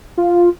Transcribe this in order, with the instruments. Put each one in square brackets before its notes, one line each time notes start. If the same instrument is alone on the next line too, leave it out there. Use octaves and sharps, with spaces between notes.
[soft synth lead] F4